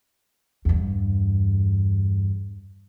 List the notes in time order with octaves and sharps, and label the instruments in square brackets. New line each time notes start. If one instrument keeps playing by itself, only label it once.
[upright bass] E2 G2